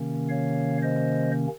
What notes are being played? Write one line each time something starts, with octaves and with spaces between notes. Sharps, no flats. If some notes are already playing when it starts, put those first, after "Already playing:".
Already playing: C3 D#3 A#3 C#4
C#5 F5
C5 D#5